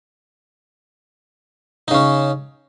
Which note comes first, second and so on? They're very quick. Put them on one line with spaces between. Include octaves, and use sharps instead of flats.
D#4 C#3 C#4